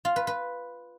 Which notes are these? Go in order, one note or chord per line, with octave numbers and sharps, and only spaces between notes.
F4
B4
B4